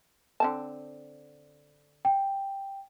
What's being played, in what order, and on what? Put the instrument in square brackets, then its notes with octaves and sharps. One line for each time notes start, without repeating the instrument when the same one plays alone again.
[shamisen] D3 C4 A5
[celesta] G5